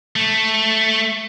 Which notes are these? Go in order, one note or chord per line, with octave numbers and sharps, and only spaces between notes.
A3